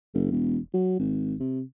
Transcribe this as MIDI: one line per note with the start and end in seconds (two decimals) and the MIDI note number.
0.14 0.29 30
0.31 0.58 28
0.74 0.98 54
0.99 1.34 32
1.40 1.62 48